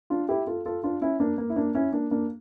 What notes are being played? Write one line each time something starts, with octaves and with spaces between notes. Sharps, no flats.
D4 F4
E4 G4
F4 A4
F4 A4
D4 F4
C#4 E4
A#3 D4
A#3
E4
A#3 D4
C#4 E4
A#3 D4
A#3 D4